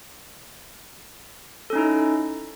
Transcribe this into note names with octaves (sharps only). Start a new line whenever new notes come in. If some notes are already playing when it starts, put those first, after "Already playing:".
C#4 D#4 E4 A4